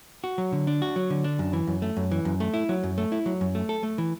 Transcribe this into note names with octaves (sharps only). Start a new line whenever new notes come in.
F#4
F#3
D3
D4
F#4
F#3
D3
D4
F#2
E3
F#2
A3
F#2
E3
F#2
A3
E4
F#3
F#2
A3
E4
F#3
F#2
A3
A4
A3
E3